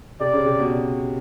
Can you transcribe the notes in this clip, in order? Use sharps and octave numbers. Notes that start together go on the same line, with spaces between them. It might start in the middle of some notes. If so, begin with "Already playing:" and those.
C3 D5
C#3
C3
B2